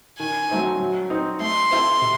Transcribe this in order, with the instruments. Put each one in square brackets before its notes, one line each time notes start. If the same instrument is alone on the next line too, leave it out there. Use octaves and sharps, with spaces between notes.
[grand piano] D#3 [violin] G#5
[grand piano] F#3 A3 C4 D#4
F#3
C4 D#4
[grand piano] A3 [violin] C6
[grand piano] C4 E4 A4
C3